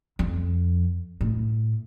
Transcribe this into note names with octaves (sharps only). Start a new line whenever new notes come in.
F2
A2